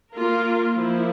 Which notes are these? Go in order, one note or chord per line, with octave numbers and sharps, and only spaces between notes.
A#3 F4 A#4
F3 A#3 E4